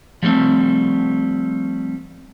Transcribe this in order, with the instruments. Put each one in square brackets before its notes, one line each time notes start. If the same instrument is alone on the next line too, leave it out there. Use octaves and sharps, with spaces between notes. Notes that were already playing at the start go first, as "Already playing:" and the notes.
[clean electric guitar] F3 G3 A3 C4